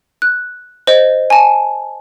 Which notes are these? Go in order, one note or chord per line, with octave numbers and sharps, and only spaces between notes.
F#6
C5 D#5
G#5 A5